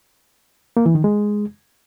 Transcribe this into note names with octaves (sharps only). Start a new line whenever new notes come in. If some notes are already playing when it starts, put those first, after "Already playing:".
A#3
E3
D#3
G#3